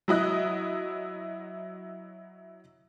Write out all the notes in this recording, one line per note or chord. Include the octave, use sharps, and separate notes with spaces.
F#3 E4 D#5 F#6